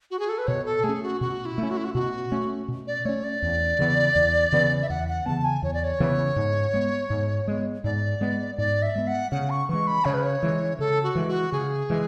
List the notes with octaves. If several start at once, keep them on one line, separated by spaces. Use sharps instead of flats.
F#4
G#4
A4
B4
B2 C#5
A4
A3 G#4
C#4
F#4
B2 F#4
E4
A3 C#4
F#4
E4
F#4
B2 F#4
A3 C#4
B2
D5
A3 C#4 C#5
D5
E2
C#3 E3 B3
E2
C#3 E3 B3
E5
E2 F#5
F#5
C#3 E3 B3 A5
G#5
E2 C#5
D5
C#5
C#3 E3 B3
G#2
G#3 B3
G#2
G#3 B3
G#2 D5
G#3 B3
G#2 D5
E5
G#3 B3
F#5
C#3 F#5
C#6
E3 G#3 C#6
B5
C#3 C#5
B4
C#5
E3 G#3
C#3 A4
F#4
E3 G#3
F#4
C#3 G#4
E3 G#3